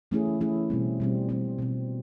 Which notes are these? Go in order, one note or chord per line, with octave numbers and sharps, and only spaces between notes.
E3 A3 C#4 E4 G#4
E3 A3 C#4 E4 G#4
B2 G3 C4
B2 G3 C4
B2 G3 C4
B2 G3 C4